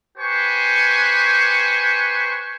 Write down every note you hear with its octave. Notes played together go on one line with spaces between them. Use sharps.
G4 B4 C5 G#5 C#6